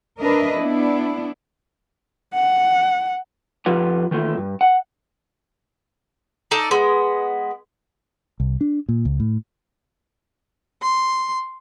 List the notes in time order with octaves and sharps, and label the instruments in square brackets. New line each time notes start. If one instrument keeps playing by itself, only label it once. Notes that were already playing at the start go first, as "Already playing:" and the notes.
[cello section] D4 A#4 B4 D#5 E5
B3 D4 E4
[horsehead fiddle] F#5
[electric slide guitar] F2 F3 F4 G4 B4 F#5
D#3 E3 A3 A#3 F4
G2
F#5
[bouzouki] D4 D#4 A4 D5
G#3 B3
[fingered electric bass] C2
D4
A#2
C#2
A2
[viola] C6